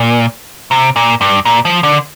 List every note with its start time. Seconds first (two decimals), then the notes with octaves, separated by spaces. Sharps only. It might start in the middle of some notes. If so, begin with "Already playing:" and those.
Already playing: A#2
0.71 C3
0.96 A#2
1.21 G2
1.45 A#2
1.65 F3
1.83 D3